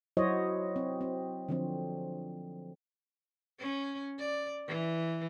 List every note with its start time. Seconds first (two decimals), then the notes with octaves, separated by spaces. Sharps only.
0.17 F#3 E4 F#4 C5 C#5 D#5
0.76 C4
1.01 C4
1.48 D3 F3 C4
3.59 C#4
4.19 D5
4.67 E3